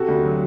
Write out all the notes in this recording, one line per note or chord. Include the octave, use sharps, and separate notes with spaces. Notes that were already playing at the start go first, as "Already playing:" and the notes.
Already playing: C3 F#4 A4
D2
F#3